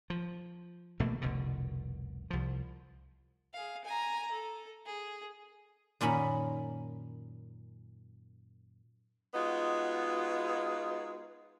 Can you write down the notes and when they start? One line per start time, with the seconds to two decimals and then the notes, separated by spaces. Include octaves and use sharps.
0.10 F3
1.00 G#1 B2 A3 A#3
1.21 F1 C2 B2 D3
2.30 C2 F3
3.53 G#4 F5
3.85 G#5 A#5
4.31 A4
4.85 G#4
6.01 F#2 A#2 D#3 C#4 B5
9.34 G#3 B3 D#4 F4 F#4